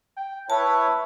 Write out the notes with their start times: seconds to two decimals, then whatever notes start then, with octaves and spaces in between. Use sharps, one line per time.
0.17 G5
0.50 E4 B4 C#5 A5